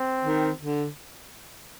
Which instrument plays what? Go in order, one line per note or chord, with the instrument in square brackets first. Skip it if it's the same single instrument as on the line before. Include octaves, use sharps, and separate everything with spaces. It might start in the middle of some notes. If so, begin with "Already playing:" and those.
Already playing: [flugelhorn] C4
[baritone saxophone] D#3
D3